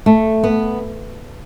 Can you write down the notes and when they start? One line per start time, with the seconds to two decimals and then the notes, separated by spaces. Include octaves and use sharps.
0.06 A3
0.44 B3